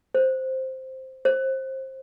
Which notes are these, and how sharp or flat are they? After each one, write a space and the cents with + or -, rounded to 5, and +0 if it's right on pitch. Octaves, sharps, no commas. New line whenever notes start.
C5 +0
C5 +25